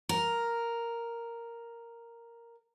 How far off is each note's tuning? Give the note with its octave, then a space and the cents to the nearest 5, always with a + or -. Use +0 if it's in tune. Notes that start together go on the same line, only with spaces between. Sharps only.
A#4 +0